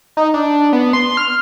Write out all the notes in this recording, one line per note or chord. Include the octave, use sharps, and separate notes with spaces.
D#4
D4
B3
C6
F6